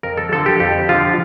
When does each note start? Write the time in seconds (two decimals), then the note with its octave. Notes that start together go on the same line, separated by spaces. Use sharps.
0.03 F2 A#4
0.17 A4
0.32 D3 F3 A4
0.46 G4
0.60 F2 G4
0.89 D3 F3 F4